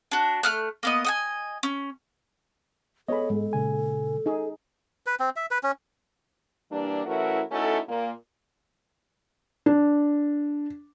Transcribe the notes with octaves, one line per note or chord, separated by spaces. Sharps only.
D4 F#4
A3 F6 F#6
A#3 B3 D#5
D#5 F#5 G#5
C#4
B3 G#4 A4 C#5 D#5 B5
G#2 G#3
A#2 C#3 G#5
D#4 G#4
B4
C4
E5
B4
C#4
E3 G3 A#3 D4
E3 A3 C#4 E4 F#4 A#4
A3 C#4 D#4 E4 F#4 A4
A#2 A#3
D4